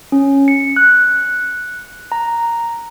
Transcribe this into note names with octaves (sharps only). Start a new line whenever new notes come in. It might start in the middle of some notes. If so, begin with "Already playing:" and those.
C#4
C#7
F#6
A#5